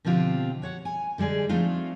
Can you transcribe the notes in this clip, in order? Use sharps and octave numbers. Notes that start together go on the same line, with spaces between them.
B2 D3 F3 C4 F4 G4
F#4 C#5 F#5
G#5
D3 G3 G#3 G#4 D5
F3 A3 C4 D4 D#4 F4